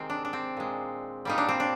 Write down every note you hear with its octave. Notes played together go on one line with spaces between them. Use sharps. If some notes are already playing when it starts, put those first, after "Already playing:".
Already playing: C3 D#3 G#3 C4
D4
D4
C4
A#2 G#3
A#2 G3 A#3 D#4
D4
C4
D4